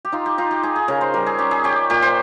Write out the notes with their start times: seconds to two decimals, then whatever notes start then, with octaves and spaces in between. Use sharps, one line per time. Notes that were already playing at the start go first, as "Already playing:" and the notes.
0.05 G4
0.12 D#4 F4
0.26 G4
0.38 D#4 F4
0.51 G4
0.63 D#4 G#4
0.76 G#4
0.88 C#3 A#4
1.01 C5
1.14 G3 A#4
1.26 G#4
1.38 C#4 G4
1.51 G#4
1.64 C#4 G4
1.90 A#2 G4
2.02 C5